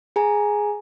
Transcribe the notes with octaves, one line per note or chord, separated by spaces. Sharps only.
G#4 G#5 A#5